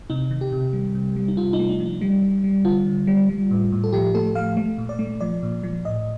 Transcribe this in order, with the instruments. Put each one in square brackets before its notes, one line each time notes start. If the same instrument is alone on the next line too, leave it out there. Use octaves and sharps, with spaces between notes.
[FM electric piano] C3 D#4
D#3
G4
C3
G3
C3
G3
D#4
C3 F4
D#4
A3
D4
F3
D#4
G3
G3
G3
D3 F4
D3
G3
G3
A2
A2
A4
F3 G4
A3 A4
A3 F5
A3
A#2
D5
A3
F3 D5
A#2
F3
A2 D#5